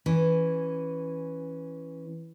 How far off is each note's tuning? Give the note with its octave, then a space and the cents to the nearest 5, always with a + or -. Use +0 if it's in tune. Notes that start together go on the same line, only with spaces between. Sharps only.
E3 +0 C#4 -5